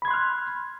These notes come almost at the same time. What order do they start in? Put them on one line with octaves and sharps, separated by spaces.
B5 G#6 C6 F#6 F6